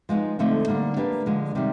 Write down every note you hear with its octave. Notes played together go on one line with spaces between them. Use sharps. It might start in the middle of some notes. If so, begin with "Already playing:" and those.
F3 G#3 B3 D#4
D3 F3 A3 C4 D#4
D3 G3 A#3
A#3 D4 G4 B4
D3 F3 G#3
C3 D#3 G3